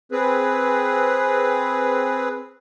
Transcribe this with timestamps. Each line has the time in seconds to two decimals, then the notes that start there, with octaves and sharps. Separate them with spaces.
0.12 C4 G#4 B4